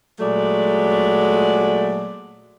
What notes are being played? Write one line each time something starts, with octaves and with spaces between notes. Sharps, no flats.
A#2 F#3 G#3 A3 D5